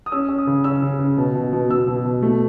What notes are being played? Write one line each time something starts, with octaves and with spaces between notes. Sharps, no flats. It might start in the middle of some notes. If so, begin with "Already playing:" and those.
D#6
C#4 E6
C#4
D#6
C#3
C#4 E6
C#3
C#3
B2
B2
B2
B2 E6
B2
B2
A3